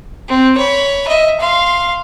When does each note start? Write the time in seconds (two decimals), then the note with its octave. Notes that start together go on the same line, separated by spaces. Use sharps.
0.28 C4
0.57 C#5 B5
1.08 D#5 E5
1.40 F5 C6